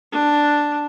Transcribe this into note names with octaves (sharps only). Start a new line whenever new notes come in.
D4